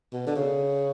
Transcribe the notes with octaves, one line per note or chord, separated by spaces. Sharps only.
B2
D3
C#3